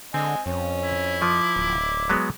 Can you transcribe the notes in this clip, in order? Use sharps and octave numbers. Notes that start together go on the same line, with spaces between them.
D3 C4 D#5 G#5
F2 C#4
E4
F3 D6
D1
F#3 G#3 B3